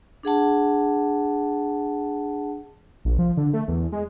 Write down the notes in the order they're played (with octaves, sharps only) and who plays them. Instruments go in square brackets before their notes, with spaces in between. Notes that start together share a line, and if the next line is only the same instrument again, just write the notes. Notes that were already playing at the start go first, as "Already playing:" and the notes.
[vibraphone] D4 G#4 F#5 A5
[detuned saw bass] A#1
F3
D3
A3
E2
G#3